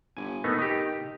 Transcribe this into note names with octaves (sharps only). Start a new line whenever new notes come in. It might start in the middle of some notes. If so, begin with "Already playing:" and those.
G1 G#5
D#3 A3 B3 D#4
D#4 G4